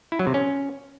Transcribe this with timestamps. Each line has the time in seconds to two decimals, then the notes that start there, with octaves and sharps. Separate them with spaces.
0.12 E4
0.19 F#3
0.27 C3
0.34 C#4